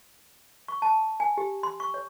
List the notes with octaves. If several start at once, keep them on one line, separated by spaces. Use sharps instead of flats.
C#6
A5
G#5
G4
C6
C#6
C#5